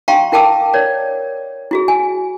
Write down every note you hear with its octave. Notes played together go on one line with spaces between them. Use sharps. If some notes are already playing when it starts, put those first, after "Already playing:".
F5 G5 A#5 C6 C#6
E4 A#4 G5 A5 D6 E6
A#4 C#5 D5
E4 F#4 G#4
G#5